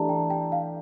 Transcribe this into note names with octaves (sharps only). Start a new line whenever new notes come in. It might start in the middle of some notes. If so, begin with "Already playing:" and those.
Already playing: E3 A3 D4 G4 A5 A#5
G5
G5
F5